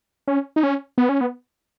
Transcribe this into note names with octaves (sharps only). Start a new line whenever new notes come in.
C#4
D#4
C#4
B3
C#4
B3